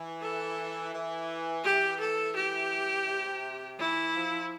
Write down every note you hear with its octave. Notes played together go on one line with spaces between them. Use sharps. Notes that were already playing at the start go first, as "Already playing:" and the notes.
Already playing: E3
A4
E3
E3 G4
A4
G4
C3
E3 E4
F3